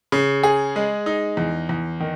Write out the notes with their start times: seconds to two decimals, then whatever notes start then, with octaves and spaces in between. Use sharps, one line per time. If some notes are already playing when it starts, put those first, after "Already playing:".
0.12 C#3
0.43 G#4
0.76 G#3
1.06 D#4
1.37 E2
1.69 E2
2.00 D#3